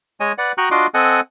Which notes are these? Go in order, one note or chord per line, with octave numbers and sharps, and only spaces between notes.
G#3 C#5 D#5 G#5
B4 D5 F#5
F#4 G5 A#5 C#6 D#6 F#6
D4 F4 F#4 D#5 C6 D6
C4 A4 D#5 F#5 G#5